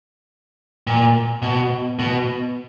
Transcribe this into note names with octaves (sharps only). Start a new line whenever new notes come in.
A#2
B2
B2